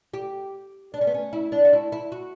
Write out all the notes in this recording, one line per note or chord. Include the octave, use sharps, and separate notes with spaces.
G4
D4
C#4
B3
C#4
E4
D4
F#4
E4
E4
F#4